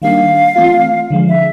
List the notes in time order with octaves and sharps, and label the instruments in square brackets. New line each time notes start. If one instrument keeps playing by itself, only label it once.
[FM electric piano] D#3 G3 A#3 D4 [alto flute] F5
[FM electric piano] E3 A3 C4 F4
D3 F3 G#3
[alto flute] E5